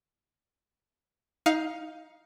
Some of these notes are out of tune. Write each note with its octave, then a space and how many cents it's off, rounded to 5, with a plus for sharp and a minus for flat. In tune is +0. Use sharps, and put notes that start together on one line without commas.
D#4 +20 F5 +0